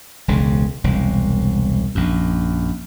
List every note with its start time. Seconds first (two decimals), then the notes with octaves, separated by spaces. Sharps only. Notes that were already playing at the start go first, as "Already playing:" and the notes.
0.28 E1 C#2 C#3
0.84 E1 C2
1.95 A#1 F#2